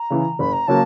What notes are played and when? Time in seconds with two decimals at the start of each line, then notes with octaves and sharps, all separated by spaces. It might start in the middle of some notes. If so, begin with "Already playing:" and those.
Already playing: A#5
0.10 C#3 E3
0.39 F#1 B5
0.53 A#5
0.68 C#3 F#3 A#3 A5